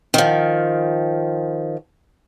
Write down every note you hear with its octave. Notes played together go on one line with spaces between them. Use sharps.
D#3 F3